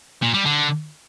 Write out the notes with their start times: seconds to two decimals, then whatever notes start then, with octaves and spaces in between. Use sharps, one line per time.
0.22 A#2
0.34 G3
0.45 D3